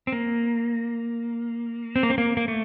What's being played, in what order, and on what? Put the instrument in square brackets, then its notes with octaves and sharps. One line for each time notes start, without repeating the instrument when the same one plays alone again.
[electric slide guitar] C4
A#3
C4
A#3
C4
A#3
A#3
A3